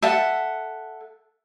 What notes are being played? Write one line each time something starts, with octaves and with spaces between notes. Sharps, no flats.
A4 E5 F#5